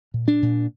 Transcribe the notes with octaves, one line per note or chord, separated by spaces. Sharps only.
A#2
D4
A#2